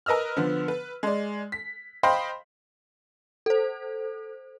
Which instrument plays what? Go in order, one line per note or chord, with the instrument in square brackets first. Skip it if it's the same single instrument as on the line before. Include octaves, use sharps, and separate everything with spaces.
[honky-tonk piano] A#4 B4 D#5 E6 F6
D3 F3 B3
B4
G#3 D5
B6
C5 D#5 F5 G5 B5 C6
[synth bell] A4 C5